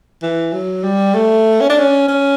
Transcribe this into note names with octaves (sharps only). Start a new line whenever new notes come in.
E3
F#3
G3
A3
C#4
D4
C#4
C#4